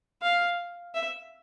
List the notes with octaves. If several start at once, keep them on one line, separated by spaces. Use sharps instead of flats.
F5
E5